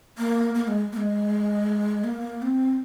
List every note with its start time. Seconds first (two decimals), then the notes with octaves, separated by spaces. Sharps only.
0.18 A#3
0.55 A#3
0.68 G#3
0.93 A#3
0.97 G#3
2.04 A#3
2.42 C4